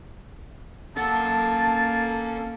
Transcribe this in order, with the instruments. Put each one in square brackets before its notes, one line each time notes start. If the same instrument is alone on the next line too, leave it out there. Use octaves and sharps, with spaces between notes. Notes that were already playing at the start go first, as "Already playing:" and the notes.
[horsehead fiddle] A#3 [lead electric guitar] C#4 F#5 [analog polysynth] A4 [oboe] A5